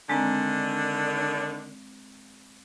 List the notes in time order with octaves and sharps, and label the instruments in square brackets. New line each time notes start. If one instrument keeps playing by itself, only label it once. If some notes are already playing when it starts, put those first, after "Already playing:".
[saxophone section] D3 D#3 D4 [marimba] G#3 C4 A#5